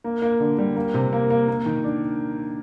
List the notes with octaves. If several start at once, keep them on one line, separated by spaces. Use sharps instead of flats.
A#3
A#3
D3
G3
A#3
C3
A#3
A#3
A#3
D#3
D4